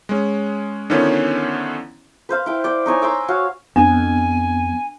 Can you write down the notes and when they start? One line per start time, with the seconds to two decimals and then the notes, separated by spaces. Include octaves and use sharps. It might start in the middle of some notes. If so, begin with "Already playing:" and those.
0.09 G#3 C#4
0.90 D3 D#3 F3 B3 C#4 E4
2.29 B4 C5 F5
2.46 E4 G5
2.64 D5 G5
2.86 D#4 C#5 G#5
3.02 A#5 C6 D6 E6
3.28 F#4 C#5 F5
3.76 F2 B3 D4 G#5